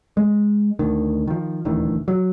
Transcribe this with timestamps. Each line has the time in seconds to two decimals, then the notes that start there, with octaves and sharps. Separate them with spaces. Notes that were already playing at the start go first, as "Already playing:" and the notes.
0.17 G#3
0.79 D2 D#3
1.27 D#3 F3
1.65 D#1 D2 D#3 E3
2.08 F#3